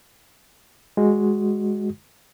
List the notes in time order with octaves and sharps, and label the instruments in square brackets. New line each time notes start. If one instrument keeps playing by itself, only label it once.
[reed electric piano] G#3 F#4